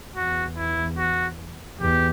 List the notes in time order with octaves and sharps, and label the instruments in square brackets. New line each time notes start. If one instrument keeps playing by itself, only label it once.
[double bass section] E2 [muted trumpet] F#4
[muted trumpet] E4
F#4
[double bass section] E2 [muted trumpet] G4